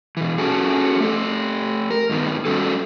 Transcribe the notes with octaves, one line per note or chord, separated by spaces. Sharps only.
B2 E3
C#4 F#4 G#4 A4
A3 G4 A4
A#4
G2 D#3 B3
G3 A3 C#4 F#4 A4